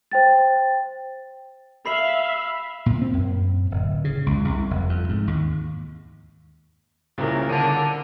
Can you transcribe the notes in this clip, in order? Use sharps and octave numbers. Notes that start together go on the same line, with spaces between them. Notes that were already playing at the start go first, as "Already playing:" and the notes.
C5 G5 A6
E5 F5 B5 C7 F#7
A#2
C4
F#2
D1
C#3
C#2
C2
F1
F2
G#2
D#2
C2 A#2 C#3 A#4
D3 A5